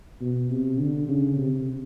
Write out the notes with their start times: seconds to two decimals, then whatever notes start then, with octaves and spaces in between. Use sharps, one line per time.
0.21 B2
0.50 C3
0.79 D3
1.08 C#3
1.37 C3